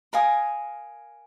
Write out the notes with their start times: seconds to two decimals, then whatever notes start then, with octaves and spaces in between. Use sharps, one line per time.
0.13 A#4 F5 G#5 D#6